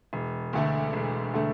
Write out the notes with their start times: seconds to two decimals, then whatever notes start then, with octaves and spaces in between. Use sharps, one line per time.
0.13 E1
0.53 D2 D3 A3
0.93 E1
1.34 D3 A3